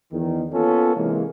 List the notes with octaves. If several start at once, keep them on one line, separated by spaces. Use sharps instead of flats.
E2 D#3
A#3 B3 C#4 F4 A4
C3 E3 G#3 A#3